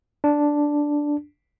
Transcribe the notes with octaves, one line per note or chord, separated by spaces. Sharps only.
D4